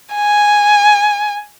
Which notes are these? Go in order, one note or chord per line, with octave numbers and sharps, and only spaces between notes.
G#5